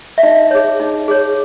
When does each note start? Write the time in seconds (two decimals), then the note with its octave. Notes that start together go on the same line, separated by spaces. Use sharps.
0.18 E5
0.23 D#4 D#5
0.51 G#4 C#5
0.80 D#4
1.08 G#4 C#5